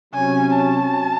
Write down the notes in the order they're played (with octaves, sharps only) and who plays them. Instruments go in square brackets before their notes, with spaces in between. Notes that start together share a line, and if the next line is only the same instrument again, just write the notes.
[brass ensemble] C3 F#3 C#4 [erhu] G#5
[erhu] A5